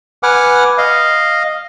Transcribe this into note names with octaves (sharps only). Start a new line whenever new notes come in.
B4 F#5 G#5 D6 F6
D#5 F5